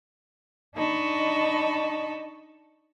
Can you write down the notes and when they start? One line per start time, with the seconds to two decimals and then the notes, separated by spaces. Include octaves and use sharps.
0.75 D4 D#4 D#5 A5 B5 C#6